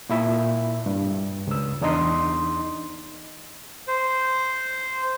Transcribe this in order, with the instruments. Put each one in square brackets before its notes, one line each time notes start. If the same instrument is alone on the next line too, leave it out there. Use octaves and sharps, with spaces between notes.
[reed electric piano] A#2 E4 E5
G2
C#2 E6
E2 D4 D#4 D#5 C6
[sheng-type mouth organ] C5